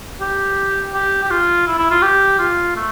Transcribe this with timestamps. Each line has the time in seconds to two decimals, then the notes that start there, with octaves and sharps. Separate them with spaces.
0.21 G4
0.94 G4
1.23 G4
1.30 F4
1.67 E4
1.79 E4
1.91 F4
2.02 G4
2.39 F4
2.76 A3